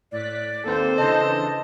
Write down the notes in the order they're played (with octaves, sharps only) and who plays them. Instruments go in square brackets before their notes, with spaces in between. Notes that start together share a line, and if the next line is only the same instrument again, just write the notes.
[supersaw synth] A2 F#6 B6 [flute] D5
[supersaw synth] D#2 A#3 C4 [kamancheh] A4 C5
[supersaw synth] C#3 E3 D4 [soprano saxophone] D#5 [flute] A5